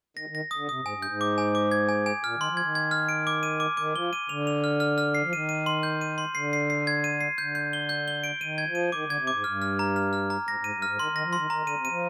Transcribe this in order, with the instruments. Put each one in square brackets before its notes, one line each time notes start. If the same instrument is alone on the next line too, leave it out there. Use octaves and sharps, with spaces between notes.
[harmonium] D#3 [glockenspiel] A#6
[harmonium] D#3
[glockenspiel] A#6
[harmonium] D3 [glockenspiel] D#6
[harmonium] C3 [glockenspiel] D#6
[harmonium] G#2 [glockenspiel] G#5
[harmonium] G2
[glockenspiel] G6
[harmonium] G#2
[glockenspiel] D6
G#5
D6
G#6
G#5
G#5
[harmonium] A#2 [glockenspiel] F6
[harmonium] D#3 [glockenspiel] C6
[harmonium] F3
[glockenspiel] G#6
[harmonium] D#3
[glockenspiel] G#6
F6
D7
D6
D#7
D6
[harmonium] D#3 [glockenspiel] D6
[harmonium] F3 [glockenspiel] G7
[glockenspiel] D#7
[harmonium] D3 [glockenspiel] F7
[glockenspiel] F7
F6
F6
F6
C7
[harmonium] F3
[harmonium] D#3 [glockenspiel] D#7
[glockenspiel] D#7
C6
G6
D#7
C6
[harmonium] D3 [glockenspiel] C7
[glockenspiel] C7
C7
G#6
D#7
C7
[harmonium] D3 [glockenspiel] G6
[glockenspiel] G6
G7
G6
G7
D7
[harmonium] D#3 [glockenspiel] D#7
[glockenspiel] G#6
[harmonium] F3
[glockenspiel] D#7
[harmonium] D#3 [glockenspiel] D6
[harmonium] D3 [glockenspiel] G#6
[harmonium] C3
[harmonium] G#2 [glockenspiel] D6
[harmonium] G2 [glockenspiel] F6
[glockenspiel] F6
A#5
F6
F6
A#5
[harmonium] G#2 [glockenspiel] A#6
[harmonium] G#2 [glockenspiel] D#7
[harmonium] G2
[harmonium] G#2 [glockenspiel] F6
[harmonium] D#3 [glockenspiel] C6
[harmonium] D#3 [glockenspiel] A#6
[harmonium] F3
[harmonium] D#3 [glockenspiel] C6
[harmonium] D#3 [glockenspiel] A#5
[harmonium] D3 [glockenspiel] D#7
[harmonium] C3
[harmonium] F3 [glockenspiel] D#7